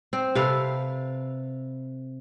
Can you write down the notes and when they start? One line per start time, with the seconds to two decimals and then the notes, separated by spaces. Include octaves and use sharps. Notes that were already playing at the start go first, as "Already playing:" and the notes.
0.13 C4 C5
0.35 C3 A4 B4 F5